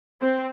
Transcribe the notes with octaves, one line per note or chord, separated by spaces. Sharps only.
C4